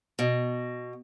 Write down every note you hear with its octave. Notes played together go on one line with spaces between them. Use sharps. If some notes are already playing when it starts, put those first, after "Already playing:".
B2